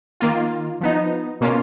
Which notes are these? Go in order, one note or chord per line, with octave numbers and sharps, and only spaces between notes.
D#3 A#3 F4
F3 B3 D#4
B2 A#3 C#4 F4